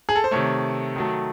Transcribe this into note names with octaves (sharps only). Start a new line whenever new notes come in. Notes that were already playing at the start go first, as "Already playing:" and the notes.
G#4
A4
C5
C3 D#3 A3 C#5
D#3 F#3 A3